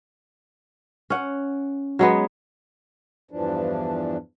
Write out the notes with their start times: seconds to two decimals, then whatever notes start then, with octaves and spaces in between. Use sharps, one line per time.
1.10 C#4 F#5
1.99 F#3 G#3 B3
3.31 E2 G2 E3 F3 D4